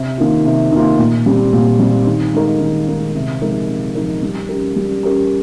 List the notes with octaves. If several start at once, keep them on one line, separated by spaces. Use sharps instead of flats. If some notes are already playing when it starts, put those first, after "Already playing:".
Already playing: C3
D#3 A#3 F4
C3
D#3 A#3 F4
A#2
G3 C4
A#2
G3 C4
D#3
G#3 D#4 A#4
D#3
G#3 D#4 A#4
C3
F3 G#3 D#4 A#4
C3
F3 G#3 D#4 A#4
G3
C#4 G4 A#4
G3
C#4 G4 A#4